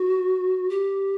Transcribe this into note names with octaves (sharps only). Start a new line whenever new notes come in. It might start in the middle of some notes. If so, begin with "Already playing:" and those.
Already playing: F#4
G4